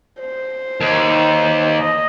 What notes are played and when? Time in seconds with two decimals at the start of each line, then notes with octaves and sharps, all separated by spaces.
0.19 C5
0.80 D#2
1.78 D#5